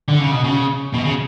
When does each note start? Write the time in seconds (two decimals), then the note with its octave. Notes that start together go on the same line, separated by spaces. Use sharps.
0.08 D3
0.19 C#3
0.31 B2
0.44 C#3
0.94 B2
1.04 C#3